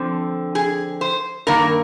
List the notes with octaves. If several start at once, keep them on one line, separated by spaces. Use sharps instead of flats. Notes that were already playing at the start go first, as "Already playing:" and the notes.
Already playing: D3 F3 C4
G#4
C5
G2 D#3 A#3 A#4